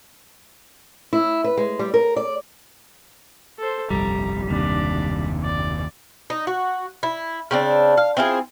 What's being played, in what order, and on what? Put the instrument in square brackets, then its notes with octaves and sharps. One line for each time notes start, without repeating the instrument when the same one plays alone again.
[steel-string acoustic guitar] E4
B4
G#3
G3
A#4
D5
[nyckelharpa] A4 C5
[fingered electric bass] G1 C2 F2 [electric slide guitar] G3 [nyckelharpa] A#5
[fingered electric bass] F#1 C3 [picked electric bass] D#2 [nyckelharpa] D4 D5
[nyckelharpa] D5
[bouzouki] D#4
F#4
E4
C#3 C4 D4
F5
C4 E4 F4 G#4